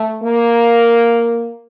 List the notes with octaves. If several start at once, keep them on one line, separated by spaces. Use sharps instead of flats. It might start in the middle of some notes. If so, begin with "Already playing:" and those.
Already playing: A3
A#3